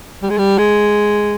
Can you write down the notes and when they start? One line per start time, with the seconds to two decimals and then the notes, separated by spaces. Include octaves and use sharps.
0.22 G3
0.30 G#3
0.38 G3
0.58 G#3